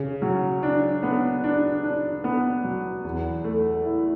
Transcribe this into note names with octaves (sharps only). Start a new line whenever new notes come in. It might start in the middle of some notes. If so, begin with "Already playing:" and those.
Already playing: C#3
F#3
D4
B3
D4
D4
B3
F#3
E2
A3
E4